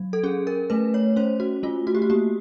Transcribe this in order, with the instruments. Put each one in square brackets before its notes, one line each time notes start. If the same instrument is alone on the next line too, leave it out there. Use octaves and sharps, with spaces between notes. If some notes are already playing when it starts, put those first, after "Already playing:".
Already playing: [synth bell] F#3
A4
C#4 G#4
A#4
A3 B4
C#5
C#4 C5
F#4
A3 F4
F#4
G4
F#4
A#3 G4